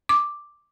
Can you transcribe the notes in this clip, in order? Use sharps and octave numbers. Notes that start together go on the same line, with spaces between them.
D6